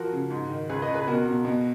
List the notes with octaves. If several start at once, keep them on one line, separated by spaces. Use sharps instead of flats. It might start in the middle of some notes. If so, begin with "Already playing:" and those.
Already playing: F3 F#4 A#4
C#3
G#2
D#3
C#2 G#4 B4
B4 D#5
C#2
G#4 B4
B2 F#4 A#4
B2
B2